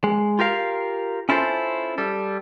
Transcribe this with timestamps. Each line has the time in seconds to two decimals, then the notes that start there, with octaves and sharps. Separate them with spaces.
0.04 G#3
0.39 F4 G4 A#4 F5
1.29 C#4 E4 F4 A4 C5
1.98 G3 A4